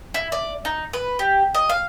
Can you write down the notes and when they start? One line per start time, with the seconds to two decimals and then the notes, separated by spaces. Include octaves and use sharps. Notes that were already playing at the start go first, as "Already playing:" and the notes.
0.14 E4
0.32 D5
0.65 D#4
0.93 B4
1.19 G4
1.55 D#5
1.69 F5